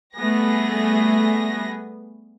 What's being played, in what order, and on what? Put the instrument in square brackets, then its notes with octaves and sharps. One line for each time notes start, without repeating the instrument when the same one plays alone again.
[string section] G3 A3 B3 G#4 A#6